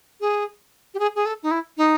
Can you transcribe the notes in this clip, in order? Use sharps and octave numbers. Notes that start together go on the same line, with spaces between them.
G#4
G4
G#4
G#4
A4
D#4
E4
D#4